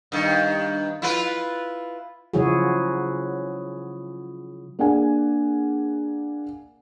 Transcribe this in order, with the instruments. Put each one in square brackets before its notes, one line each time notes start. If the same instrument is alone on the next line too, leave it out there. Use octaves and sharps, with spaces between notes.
[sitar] G2 D#3
E4 F4 B4
[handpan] C#3 F3 F#3 E4 F#4 G#4
[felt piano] A#3 D4 G#4 F#5 G#5